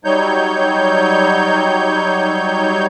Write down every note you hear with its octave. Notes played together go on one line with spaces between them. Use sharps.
F#3 G3 D#4 C#5 G6